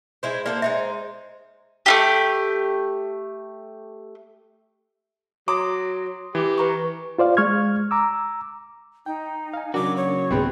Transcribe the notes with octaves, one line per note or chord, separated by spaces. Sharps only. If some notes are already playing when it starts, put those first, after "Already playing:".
G#3 E4 C5
A#3 A4 C5 D5
G#3 D#4 C5 E5
A3 F4 G4
F#3 A#5 C6 D6 D#6
E3 G4
B4 A#5 C#6
F4 C5 D5 F5
G#3 C#6 F6 G#6
A#5 D6 E6
D#4 G5
F5 G#5
C#3 F#3 D4 F#4 A#4 D6
C#5
C2 G#2 D3 G#3 B3 C4